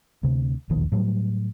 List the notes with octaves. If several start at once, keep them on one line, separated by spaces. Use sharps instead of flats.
D2 C3
E1 A#1 D#2 D#3
A2 F#3 G3